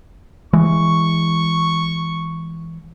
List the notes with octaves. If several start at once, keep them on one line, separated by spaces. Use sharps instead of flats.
E3 G#3 C#6